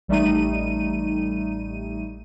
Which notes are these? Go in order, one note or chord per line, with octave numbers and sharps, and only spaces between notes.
A1 G3 A3 D#4 D#7